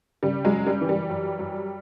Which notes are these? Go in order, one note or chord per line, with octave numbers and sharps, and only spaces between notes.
C#3 G3
F#3 G#3
F#2
G3
E3
G3
F#2
F#2